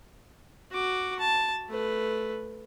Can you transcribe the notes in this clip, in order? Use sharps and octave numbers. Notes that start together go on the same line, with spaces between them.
F#4 D6
A5
A3 B4